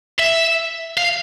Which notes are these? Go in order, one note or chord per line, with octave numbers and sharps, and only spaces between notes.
E5
F5